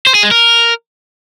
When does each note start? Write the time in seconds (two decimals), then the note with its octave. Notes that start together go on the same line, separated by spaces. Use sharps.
0.07 C5
0.15 G#4
0.23 G#3
0.31 A#4